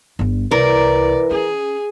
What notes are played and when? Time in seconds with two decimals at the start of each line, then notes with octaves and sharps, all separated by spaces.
0.19 G1 G2
0.51 C2 E3 A#4 D5
1.31 C#4 G#4